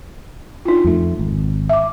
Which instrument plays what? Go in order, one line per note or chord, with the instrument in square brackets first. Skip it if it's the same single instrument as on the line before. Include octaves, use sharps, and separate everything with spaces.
[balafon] D#4 F4
[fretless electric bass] F2 A3
G#1
[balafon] E5 D6